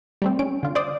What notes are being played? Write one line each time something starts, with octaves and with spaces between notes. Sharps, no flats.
G3 A3 C4
C#4 D7
D3 F4
C5 D5 D6 D#6